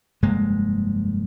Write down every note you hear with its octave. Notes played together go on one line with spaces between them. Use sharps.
F1 G2 G#3 A#3